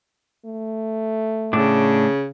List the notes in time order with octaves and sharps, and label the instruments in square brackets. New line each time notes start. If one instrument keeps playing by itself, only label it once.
[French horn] A3
[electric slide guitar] A2 D4 [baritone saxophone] C#3